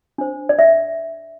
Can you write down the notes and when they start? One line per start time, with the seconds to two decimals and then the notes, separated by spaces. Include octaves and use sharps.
0.18 D4 C5
0.49 D5
0.59 E5